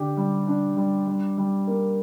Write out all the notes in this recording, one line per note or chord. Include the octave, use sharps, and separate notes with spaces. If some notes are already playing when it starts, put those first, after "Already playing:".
Already playing: D3 D4 G4
G3
D4
G3
G3
G3
A#3